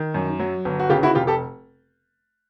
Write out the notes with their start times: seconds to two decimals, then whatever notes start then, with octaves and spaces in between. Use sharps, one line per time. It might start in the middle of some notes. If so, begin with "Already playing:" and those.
Already playing: D#3
0.14 F#2
0.40 F#3
0.65 G1
0.80 F#4
0.89 C#3 F4 G4
1.03 E4 F#4
1.15 F1 F4 G4
1.27 G4 A4